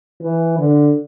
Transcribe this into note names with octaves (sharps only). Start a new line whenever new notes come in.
E3
D3